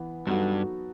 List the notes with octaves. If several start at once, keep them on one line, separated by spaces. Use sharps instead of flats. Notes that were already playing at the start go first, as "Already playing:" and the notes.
Already playing: E3 B3
G2 F#3 B3 D#4 F#4 A4